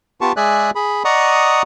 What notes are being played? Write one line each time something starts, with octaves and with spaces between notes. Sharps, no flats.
B3 F4 G4 A5 C#6
G#3 G#4 D5 E5 G#5 F#6
G#4 B5
D5 D#5 F#5 A#5 C#6 D#6